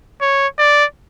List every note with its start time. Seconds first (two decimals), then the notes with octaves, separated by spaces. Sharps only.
0.21 C#5
0.58 D5